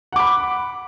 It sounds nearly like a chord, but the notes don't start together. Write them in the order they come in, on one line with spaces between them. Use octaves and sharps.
F#5 D6 B5